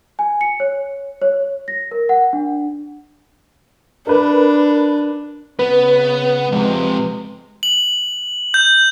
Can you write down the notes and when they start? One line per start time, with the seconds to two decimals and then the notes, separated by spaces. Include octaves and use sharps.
0.19 G#5
0.41 C#7
0.60 C#5
1.21 C#5
1.68 A#6
1.91 A#4
2.09 F#5
2.33 D4
4.07 D4 A#4 B4
5.59 C#3 B3 B4
6.52 F2 C3 G#3
7.63 F#7
8.54 G6